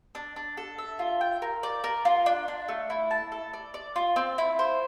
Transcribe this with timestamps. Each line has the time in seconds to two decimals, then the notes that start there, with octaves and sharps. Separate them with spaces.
0.15 D4
0.36 D4
0.57 A4
0.78 E5
0.99 F4
1.21 G5
1.42 A#4
1.63 D5
1.84 A#4
2.05 F4
2.26 D4
2.48 D4
2.68 A3
2.90 E4
3.11 A5
3.32 A4
3.54 D5
3.74 D5
3.96 F4
4.16 C4
4.38 E4
4.59 C5